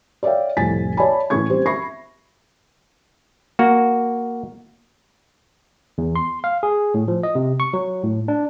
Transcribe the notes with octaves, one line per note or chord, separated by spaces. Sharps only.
C#5 D5 E5 F5 G5
C2 F2 A2 G#5 A6 B6
C#5 D5 E5 G#5 A5 B5
A2 E3 C#4 C#6 G#6
G3 C4 G4 C5
E5 B5 C#6 A#6 C7
A#3 F#4
E2
C6
F5
G#4
A2
F3
D#5
C3
C#6
F#3
A2
D4